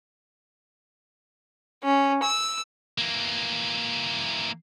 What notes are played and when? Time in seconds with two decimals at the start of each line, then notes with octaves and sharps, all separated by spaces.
1.84 C#4
2.23 E6
2.98 E3 A#3